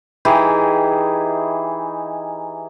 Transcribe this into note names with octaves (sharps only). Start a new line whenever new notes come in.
E3 D#4 G4 G#4